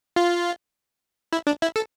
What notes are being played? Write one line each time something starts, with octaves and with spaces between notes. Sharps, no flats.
F4
E4
D4
E4
A4